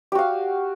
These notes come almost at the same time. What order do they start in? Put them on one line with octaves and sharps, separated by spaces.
G4 F#4 F5